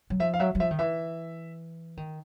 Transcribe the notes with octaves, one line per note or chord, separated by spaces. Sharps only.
F#3
F3 E5
F5
F#3 E5
F#3
F3 E5
D#3
E3 E5
D#3